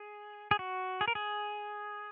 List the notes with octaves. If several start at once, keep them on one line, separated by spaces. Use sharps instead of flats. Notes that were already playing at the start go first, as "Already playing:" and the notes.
Already playing: G#4
G#4
F#4
G#4
A#4
G#4